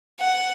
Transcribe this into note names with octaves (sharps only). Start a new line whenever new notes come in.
F#5